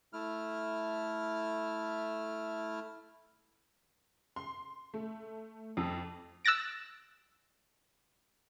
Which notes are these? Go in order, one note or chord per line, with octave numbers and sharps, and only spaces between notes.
A3 E4 F6
C6
A3
F2
E6 F#6 A6 A#6 D7